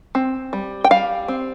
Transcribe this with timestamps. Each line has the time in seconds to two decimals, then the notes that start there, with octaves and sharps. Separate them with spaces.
0.15 C4
0.53 G3
0.84 G5
0.91 G3 F5
1.28 C4